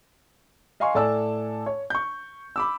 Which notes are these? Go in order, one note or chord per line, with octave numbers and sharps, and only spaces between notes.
D#5 F5 G#5 C6 C#6
A2 A4 D5 G#5 A5 E6
C#5
C#6 G6
B5 D6 E6